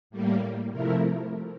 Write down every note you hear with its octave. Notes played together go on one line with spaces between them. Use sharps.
A2 G3 A#3
C3 F3 A3 E4 A#4